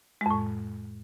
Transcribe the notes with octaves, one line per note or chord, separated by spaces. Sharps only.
F2 A2 G#3